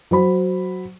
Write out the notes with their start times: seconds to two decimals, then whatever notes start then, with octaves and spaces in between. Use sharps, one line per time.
0.11 F#3 C5 B5